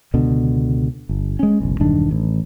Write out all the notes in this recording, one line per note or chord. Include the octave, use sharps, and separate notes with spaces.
C#2 B2 D3
G1
G#3 C#4
F#1 B1
E1 G2 D#3 D4
A1